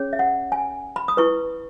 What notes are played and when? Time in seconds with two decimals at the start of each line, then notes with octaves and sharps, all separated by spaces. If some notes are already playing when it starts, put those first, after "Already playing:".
Already playing: C#4 G#4 C#5
0.13 E5
0.19 F#5
0.52 G#5
0.96 B5
1.08 D#6
1.17 E4 B4 C#6